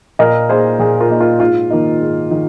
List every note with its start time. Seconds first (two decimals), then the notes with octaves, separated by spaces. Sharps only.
0.19 A#2 A#4 D#5
0.49 A#3 D#4 G#4 C5
0.79 A#2 G#4
1.00 F4 A#4
1.10 A#3 D#4
1.20 F4 A#4
1.40 G#2 F4
1.70 D#3 A#3 D#4
2.01 G#2
2.31 D#3